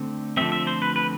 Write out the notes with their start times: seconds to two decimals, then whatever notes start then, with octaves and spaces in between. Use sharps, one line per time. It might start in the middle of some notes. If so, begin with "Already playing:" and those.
Already playing: D3 A3 C4
0.37 D3 F3 A3 C4 E5
0.52 E5
0.67 C5
0.82 B4
0.96 B4